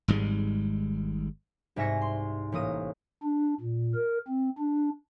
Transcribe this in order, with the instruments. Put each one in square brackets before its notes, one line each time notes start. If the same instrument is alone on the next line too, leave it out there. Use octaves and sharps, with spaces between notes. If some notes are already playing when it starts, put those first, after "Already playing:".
[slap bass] G#1 G#2 G3 G#3
[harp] C2 G#2 E5 G#5 A#6 C#7
C6
A1 A#3 D#6 D#7
[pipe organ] D4
A#2
A#4
C4
D4